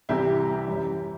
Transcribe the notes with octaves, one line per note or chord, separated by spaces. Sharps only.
C2 C3 E3 E4 G4
F#2 E3